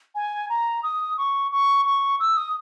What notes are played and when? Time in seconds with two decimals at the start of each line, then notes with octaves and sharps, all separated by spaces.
0.15 G#5
0.50 A#5
0.83 D#6
1.18 C#6
1.52 C#6
1.85 C#6
2.20 E6
2.37 D#6